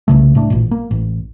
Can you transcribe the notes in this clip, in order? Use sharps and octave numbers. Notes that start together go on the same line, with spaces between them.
C2 C#3 A3
A2 A3 D4
A1 A#2
A#3
A1